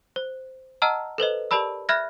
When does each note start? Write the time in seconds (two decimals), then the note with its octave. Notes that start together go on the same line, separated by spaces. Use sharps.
0.16 C5
0.82 D#5 F#5 A5 A#5 E6 F6
1.18 A4 B4 C5 D#5
1.51 G4 A#4 D5 A5 B5 E6
1.89 E5 B5 F6 F#6 G#6 A#6